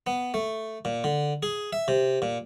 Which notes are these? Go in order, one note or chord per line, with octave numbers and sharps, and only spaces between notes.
B3
A3
A#2
D3
G#4
E5
C3
A#2